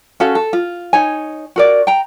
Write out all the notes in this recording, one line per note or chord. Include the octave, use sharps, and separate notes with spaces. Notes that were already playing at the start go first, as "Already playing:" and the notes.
C#4 F#4 A4 F5
A4
F4
D#4 C#5 G#5
F#4 A#4 D5
G5 A#5